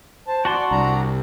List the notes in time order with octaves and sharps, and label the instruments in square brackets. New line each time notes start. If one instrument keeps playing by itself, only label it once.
[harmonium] C5 A5
[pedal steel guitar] F#4 A5 C6 [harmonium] D5
[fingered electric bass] C2 [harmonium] D4 A#5